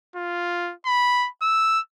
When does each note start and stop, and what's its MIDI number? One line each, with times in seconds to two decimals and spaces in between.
0.16 0.73 65
0.86 1.28 83
1.42 1.80 88